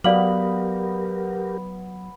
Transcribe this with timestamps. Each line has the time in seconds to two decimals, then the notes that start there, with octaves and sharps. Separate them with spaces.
0.04 F#3 B3 G4 A#4 B4 D5 F5 F#7